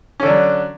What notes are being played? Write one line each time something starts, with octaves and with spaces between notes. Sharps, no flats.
D3 F#3 C#4 D4